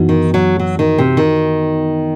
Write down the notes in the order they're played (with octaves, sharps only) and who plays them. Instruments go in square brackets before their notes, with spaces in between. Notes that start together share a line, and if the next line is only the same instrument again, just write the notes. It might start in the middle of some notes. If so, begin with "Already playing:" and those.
Already playing: [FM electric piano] F#2 E3 B3 D#4 F#4
[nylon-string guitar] D#3
F#3
F#3
D#3
C3
D#3